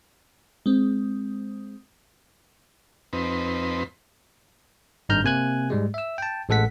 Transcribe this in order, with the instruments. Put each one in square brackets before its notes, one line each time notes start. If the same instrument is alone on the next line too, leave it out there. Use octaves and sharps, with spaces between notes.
[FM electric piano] G#3 C4
[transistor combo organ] F2 C4 D#4 B4
[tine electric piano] G#1 G2 D#4 A#5 F6 G6
C3 A#3 G#5 F#6 G#6
G#2 G3 G#3
E5 E6
G5 A5
A1 G#3 A4 F#5 B6